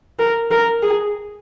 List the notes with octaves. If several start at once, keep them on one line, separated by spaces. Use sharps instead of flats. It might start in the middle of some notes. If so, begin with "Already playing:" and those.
A#4
A#4
G#4